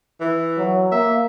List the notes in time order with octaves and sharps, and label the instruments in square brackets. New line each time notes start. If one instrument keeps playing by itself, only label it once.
[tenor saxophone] E3
[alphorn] F#3
[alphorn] A#3 [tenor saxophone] E5